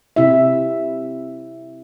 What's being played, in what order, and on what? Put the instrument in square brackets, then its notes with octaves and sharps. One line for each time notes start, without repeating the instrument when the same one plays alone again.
[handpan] C3 E4 E5